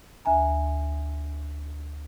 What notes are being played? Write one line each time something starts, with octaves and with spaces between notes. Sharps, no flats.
D2 E5 G#5 A#5